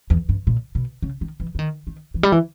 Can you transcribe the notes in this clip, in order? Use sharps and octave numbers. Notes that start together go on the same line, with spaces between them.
E2
G2
A#2
B2
C#3
D#3
E3
E3
D#3
D#3
E3
G3
E3